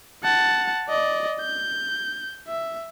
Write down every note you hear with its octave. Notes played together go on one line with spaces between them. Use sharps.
F#5 A5
D5 D#5
G6
E5